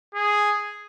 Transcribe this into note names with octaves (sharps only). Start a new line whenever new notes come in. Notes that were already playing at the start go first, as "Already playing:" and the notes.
G#4